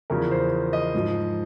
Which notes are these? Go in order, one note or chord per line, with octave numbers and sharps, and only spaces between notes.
E2 C#3 F3 A#4
C5
D#5
G#2 F3